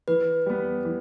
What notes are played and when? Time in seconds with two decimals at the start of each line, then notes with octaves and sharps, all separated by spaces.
0.08 E3 B4
0.46 G3 B3
0.85 E3